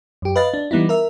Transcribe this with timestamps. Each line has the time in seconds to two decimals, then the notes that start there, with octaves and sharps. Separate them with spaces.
0.22 F#2 G4
0.36 B4 D#5 F5 A6
0.54 D4
0.71 E3 G3 B3 D#4 E4
0.89 A#4 E5